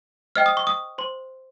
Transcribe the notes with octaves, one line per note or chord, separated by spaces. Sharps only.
C5 D#5 G5 F6
D#6
C#6
D#6
C5 C6